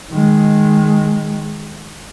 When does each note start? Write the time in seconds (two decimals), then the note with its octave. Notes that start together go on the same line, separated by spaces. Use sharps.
0.12 D#3 G#3